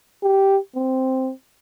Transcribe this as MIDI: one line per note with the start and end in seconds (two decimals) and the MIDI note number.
0.23 0.58 67
0.76 1.31 60